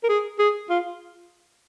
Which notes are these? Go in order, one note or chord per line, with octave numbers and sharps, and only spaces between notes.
A#4
G#4
G#4
F4